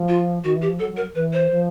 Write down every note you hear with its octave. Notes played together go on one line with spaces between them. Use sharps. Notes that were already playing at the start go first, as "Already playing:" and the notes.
Already playing: F3
F4
D#3 F#4
E3
G4
F3
F#3 A4
F#3
A#4
E3 B4
C5
F3